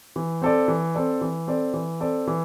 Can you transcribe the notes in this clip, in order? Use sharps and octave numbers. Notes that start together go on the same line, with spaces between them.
E3
C4 A4 D5
E3
C4 A4 D5
E3
C4 A4 D5
E3
C4 A4 D5
E3